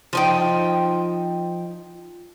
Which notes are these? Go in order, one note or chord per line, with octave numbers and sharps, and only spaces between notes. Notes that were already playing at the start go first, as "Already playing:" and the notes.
F3 D#4 G5